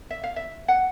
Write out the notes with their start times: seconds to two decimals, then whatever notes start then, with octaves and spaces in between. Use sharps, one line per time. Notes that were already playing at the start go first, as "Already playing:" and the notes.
0.10 E5
0.24 F5
0.36 E5
0.68 F#5